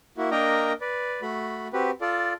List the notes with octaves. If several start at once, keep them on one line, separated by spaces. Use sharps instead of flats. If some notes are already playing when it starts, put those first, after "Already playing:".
A#3 E4 F#4
A#3 D4 A#4 D#5 G5 A#5
B4 D5
A3 F#4 B5
C4 F#4 G4 B4
F4 A4 D5